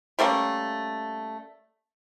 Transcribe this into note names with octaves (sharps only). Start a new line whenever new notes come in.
G3 A3 A#3 C#4